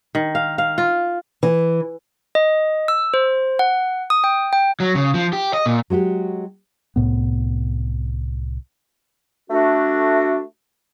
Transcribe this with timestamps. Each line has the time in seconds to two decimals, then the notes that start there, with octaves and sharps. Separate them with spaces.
0.15 D#3
0.35 F5
0.58 F5
0.78 F4
1.43 E3
2.35 D#5
2.88 E6
3.14 C5
3.59 F#5
4.10 D#6
4.24 G5
4.53 G5
4.80 F#3
4.95 C#3
5.14 F3
5.33 G4
5.54 D#5
5.66 A#2
5.90 F#3 G#3 F#4 G4
6.96 C2 A2 B3
9.50 A3 D4 F#4